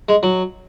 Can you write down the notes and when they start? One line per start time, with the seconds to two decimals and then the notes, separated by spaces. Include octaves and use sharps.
0.09 G#3
0.23 F#3